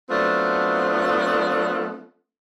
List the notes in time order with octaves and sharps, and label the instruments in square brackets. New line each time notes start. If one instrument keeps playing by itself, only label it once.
[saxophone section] F#3 A3 B3 C4 D4 F4